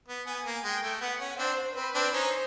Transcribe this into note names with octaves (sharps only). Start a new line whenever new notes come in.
B3
B3 G#5
A#3
G#3 G5
A3
B3 F#5
C#4
C4 D4 C5
C4 B4
C4 D4
C#4 D#4 C5